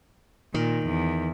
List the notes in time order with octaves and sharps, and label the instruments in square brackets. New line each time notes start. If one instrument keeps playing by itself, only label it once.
[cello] A#2 [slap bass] D#3
[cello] E2